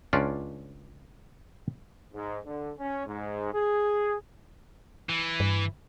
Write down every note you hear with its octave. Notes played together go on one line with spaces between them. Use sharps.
C#2 C#4 D4 F4 D5
G#2
D3
C#4
G#2
G#4
E3
G2